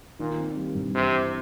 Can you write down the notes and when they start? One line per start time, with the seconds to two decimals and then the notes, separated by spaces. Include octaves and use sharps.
0.19 A#2 D#3
0.38 C4
0.56 G3
0.75 G2
0.94 C3 E3
1.13 C4